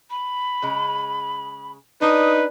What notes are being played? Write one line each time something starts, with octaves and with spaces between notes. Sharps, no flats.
B5
C#3 G#3
D4 D#4 B4 D#6